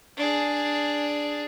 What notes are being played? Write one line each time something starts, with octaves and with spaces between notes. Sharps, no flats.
D4 G#4